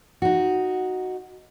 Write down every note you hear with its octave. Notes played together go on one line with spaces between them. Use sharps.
D#4 F#4